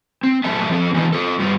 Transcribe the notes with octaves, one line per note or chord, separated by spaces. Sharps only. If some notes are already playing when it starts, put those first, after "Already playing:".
C4
A#2 F#3 A3 E5 A5
F3 C4 A4
E3 F#3 G#3 B3 D4
F4 A4
G2 G3 F4